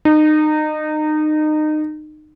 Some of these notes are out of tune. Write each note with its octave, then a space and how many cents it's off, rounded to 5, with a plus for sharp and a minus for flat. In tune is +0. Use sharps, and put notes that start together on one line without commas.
D#4 -25